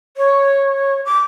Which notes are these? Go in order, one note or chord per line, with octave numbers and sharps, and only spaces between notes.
C#5
D6